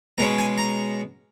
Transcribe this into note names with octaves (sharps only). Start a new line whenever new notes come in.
B2 G#3 C#4 A#5
G#5
A#5